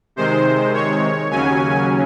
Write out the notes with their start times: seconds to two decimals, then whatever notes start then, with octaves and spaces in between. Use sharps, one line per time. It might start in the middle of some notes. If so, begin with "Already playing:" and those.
0.16 C3 D#3 G#3 C5
0.74 C#5
1.30 D#2 C#3 F#3 C#4 G#5